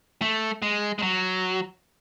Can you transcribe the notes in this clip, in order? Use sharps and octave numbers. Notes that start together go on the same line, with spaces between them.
A3
G#3
G#3
F#3